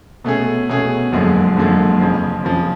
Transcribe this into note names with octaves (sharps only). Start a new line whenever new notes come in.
B2 A3 C#4 G#4
B2 A3 C#4 G#4
F#1 F#2 D3 F3 G#3
F#1 F#2 D3 F3 G#3
F2 C#3 F3
F2 C#3 F3